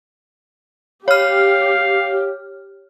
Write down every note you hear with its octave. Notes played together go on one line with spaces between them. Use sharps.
G4 C#5 F5 F6